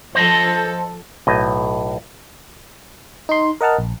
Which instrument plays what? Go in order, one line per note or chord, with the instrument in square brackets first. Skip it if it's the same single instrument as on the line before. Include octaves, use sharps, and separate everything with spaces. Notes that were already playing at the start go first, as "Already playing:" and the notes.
[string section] F3 A4 [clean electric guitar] C5 D#5 A5
[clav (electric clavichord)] B1 A2 D#5
[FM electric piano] D#4 C6
A#4 D#5 F#5 A5 F6
A#1